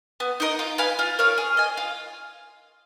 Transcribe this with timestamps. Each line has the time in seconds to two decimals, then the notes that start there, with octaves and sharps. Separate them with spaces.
0.20 B3
0.40 D#4 A#4 D#5
0.59 F4
0.78 B4 F5 G#5
0.99 F4
1.19 A#4 C#5 F5
1.38 G#4
1.57 D#5 G#5
1.77 F4